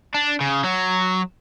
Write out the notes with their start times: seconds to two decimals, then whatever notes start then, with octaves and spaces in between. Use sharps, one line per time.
0.14 D4
0.40 C#3
0.64 F#3